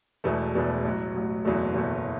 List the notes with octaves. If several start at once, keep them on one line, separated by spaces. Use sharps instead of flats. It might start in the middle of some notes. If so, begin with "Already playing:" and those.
E1 E2 B2 A3
E1 E2 B2 A3
A1 A2 F#3
A1 A2 F#3
F#1 E2 B2 F#3 A3
F#1 E2 B2 F#3 A3